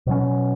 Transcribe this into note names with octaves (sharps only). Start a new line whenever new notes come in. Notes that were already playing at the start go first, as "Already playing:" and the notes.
B2 F#3 C#4